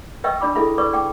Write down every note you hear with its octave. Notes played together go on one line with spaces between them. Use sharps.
B4 D#5 E5 G5 C#6 E6
D4 D5 B5 D6
E4 G#4 A4 E5 B5
B4 D5 C#6 D6
D5 G5 D6